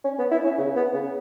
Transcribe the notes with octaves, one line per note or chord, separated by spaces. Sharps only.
C#4
B3
E4
C#4
C#3
B3
C#3